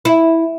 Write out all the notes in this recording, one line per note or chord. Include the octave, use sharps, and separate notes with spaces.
E4